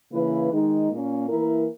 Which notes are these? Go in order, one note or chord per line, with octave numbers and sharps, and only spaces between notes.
C#3 E3 A#3 E4 B4
D#3 G#3 D#4
A#2 A#3 C#4
E3 A#3 E4 A#4